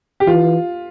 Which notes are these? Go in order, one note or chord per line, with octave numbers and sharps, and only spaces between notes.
G4
E3 F4